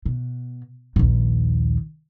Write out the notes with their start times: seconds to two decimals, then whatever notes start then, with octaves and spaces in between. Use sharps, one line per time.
0.06 B2
0.96 A#1 D#2